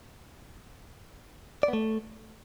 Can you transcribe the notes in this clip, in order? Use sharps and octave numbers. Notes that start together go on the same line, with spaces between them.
D5
B3
A3